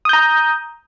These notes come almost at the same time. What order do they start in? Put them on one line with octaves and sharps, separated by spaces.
D#6 G6 A#5